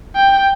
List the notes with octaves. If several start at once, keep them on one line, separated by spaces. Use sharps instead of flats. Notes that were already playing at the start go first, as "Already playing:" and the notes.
G5